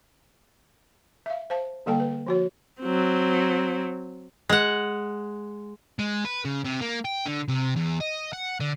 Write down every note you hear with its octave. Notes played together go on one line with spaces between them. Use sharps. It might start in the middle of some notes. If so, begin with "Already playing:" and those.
E5 F5
C5 F5 A5
D3 G3 A#3 A4 G5 A5
B4
F3 F#4 C#5
F#3 C4
G#3 F#5
G#3
B4
C#3
C3
A#3
G5
D3
C3
E2
D#5
F#5
D3